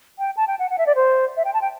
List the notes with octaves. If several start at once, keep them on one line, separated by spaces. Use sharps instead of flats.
G5
A5
G5
F#5
F#5
E5
D5
C5
E5
G5
A5
G5